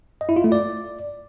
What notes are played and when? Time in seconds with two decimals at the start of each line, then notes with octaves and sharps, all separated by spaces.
0.21 D#5
0.29 E4
0.36 F4
0.44 A3
0.52 D5